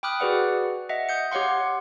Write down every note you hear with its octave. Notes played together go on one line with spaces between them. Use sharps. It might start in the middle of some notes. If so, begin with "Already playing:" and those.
G5 B5 D6 D#6 F6 F#6
F#4 G#4 B4 D5 F#5
D#5 E5 F#5
D#6 G6 C#7
G4 C#5 F5 F#5 C6